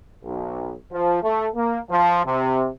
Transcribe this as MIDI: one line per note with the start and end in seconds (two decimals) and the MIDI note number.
0.24 0.74 35
0.92 1.20 53
1.23 1.48 57
1.56 1.79 58
1.90 2.22 53
2.26 2.70 48